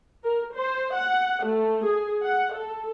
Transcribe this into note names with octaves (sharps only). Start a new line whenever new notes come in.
A#4
C5
F#5
A3
G#4
F#5
A4